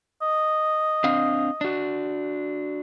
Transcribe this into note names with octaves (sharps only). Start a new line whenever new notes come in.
D#5
C4 D4 F5
D4 F#4